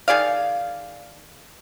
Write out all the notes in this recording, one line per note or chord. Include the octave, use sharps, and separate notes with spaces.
D#3 G#4 D5 F5